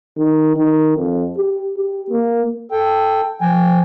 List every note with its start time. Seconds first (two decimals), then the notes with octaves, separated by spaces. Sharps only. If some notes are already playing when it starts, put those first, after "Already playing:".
0.18 D#3
0.57 D#3
0.97 F2
1.37 G4
1.77 G4
2.10 A#3
2.71 A4 G5
3.41 F3 G5 G#5